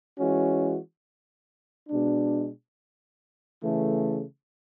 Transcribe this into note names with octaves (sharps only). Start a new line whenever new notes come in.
E3 G#3 C#4 F#4
B2 G#3 D4
C#3 E3 A3